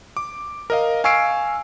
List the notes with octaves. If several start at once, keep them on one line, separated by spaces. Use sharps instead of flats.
D6
A#4 D#5 F5
F5 G#5 C#6 E6 C7 D7